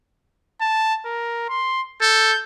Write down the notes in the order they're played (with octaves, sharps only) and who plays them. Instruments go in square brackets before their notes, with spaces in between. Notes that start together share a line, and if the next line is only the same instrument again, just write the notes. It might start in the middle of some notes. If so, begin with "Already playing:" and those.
[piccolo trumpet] A5
A#4
C6
[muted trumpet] A4 [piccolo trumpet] G6